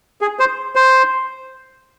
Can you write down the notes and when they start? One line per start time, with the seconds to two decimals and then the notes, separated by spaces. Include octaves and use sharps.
0.21 G#4
0.39 C5
0.75 C5